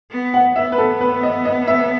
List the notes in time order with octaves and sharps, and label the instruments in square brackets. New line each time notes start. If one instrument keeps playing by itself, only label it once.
[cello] B3
[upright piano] F#5
[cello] B3 [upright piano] E5
[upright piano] B4
A4
B4
D#5
D#5
E5